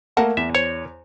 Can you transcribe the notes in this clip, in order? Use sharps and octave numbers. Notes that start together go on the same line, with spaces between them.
A3 A#3 A#4 F#5 A5
E2 E5
C5 C#5